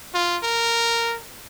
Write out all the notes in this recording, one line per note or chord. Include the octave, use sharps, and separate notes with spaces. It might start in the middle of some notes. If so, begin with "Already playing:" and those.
F4
A#4